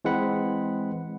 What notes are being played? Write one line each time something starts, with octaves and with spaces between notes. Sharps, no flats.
E3 G#3 C4 F#5 B5